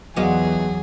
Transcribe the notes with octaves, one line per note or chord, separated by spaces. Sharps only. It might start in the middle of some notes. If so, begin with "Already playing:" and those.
E2 F#3 B3 D#4 F4 G#4 D6 D#6